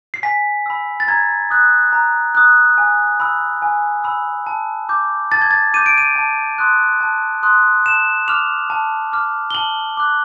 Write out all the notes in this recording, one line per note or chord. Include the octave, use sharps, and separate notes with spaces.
C7
G#5 B6
B5 E6
A6
A#5 G#6
D#6 F#6
A#5
D#6 F#6
G#5
B5 E6
G#5
B5 E6
A5
D6 G6
A5 A6
G#6
A6
D6 G6 D#7
D7
D#7
A5
C6 D#6 F#6
A5
C6 D#6 F#6
A5 E7
D6 F6 F7
A5
D6 F6
G7
A5 F#7
D6 F#6